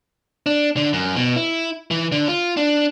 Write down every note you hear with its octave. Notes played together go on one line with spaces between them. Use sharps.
D4
D3
F#2
B2
E4
E3
D3
F4
D4